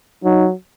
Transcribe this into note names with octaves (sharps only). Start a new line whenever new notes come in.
F#3 D#4